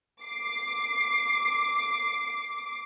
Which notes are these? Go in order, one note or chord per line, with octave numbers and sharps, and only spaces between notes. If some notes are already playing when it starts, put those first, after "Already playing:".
D6 C7